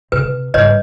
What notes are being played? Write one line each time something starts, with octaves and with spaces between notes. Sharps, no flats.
C3 B4
G#2 G3 B4 C#5 D#5